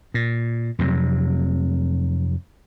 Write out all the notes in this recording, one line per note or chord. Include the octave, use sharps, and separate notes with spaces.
A#2
F2 C3 F#3